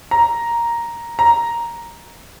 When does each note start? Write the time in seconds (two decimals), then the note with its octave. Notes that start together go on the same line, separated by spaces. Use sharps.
0.11 A#5
1.19 A#5